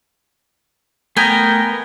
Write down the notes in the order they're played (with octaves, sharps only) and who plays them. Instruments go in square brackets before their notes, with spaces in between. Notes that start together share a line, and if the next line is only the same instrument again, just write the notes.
[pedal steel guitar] A3 A#4 G5 [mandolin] B3 G#5 A#5